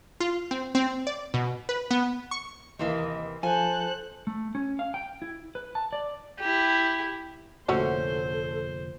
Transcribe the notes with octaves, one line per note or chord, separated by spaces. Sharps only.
F4
C4
C4
D5
B2
B4
B3
C#6
D#2 C3 E3 A#3 A#4 D#5
F3 F4 A4 C5 G#5 F#6
A3
C#4
F5
G5
E4
B4
A5
D5
E4 G4
F1 A#2 D3 A3 C#4 F#4 A4 C5